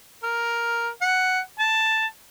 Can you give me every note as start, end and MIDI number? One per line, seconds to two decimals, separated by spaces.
0.23 0.88 70
1.01 1.40 78
1.59 2.05 81